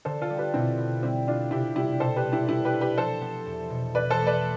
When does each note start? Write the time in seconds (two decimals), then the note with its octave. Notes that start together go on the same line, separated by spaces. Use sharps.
0.05 D3 A4 C5
0.21 F4 A4
0.30 G3
0.38 G4 B4
0.54 B2 C4 E4
0.78 B3
1.03 G3 C4 E4
1.27 B3 D4 F4
1.51 C3 E4 G4
1.76 G3 E4 G4
2.00 B2 A4 C5
2.16 G4 B4
2.25 G3
2.32 E4 G4
2.49 G3 E4 G4
2.65 G4 B4
2.73 D4
2.81 G4 B4
2.97 F3 A4 C5
3.21 B3
3.46 E2
3.70 B2
3.95 E3 B4 D5
4.10 A4 C5
4.20 A3
4.27 B4 D5